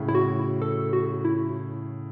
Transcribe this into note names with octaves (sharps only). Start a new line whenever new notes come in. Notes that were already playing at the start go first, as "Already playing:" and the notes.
Already playing: A2 C#3
E4
F#4
A4
F#4
E4